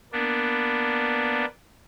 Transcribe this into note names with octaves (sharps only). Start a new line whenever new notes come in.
A#3 B3 D4